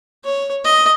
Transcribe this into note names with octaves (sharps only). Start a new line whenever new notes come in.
C#5
D#5